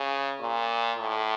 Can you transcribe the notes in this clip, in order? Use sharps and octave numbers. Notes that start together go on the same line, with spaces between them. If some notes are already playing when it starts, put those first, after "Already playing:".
Already playing: C#3
A#2
A2